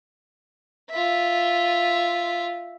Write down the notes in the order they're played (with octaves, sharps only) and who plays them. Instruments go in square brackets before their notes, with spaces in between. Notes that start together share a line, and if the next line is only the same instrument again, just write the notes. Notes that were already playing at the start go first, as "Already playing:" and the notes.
[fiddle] F4 E5